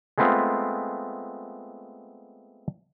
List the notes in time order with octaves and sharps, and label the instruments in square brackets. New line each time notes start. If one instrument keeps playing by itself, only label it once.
[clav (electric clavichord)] G#3 A3 B3 C4 F4